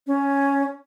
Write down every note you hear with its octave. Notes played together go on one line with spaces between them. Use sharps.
C#4